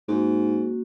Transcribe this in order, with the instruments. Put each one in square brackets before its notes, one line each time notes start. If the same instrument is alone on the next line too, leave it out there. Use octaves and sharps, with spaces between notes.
[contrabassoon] G#2 [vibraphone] A#3 C#4 F#4